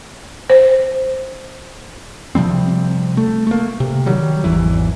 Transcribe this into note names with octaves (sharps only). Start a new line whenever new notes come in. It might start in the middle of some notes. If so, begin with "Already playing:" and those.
C5
C3 F3 G3 C4
A3
A3 A#3
C3
D#3 F#3 G3
G#1 E2 E3